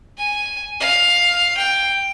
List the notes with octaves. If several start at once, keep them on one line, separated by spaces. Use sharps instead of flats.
G#5
F5
G5